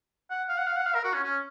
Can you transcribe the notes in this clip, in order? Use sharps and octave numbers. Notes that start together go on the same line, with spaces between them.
F#5
F5
F#5
F5
F#5
F5
A#4
F#4
C#4
C#4